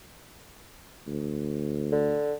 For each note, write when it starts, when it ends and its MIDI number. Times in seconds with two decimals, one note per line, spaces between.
1.07 2.16 38
1.92 2.34 50